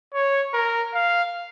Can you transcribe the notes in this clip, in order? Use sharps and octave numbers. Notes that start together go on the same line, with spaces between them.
C#5
A#4
F5